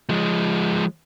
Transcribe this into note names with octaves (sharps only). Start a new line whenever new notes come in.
F3 G#3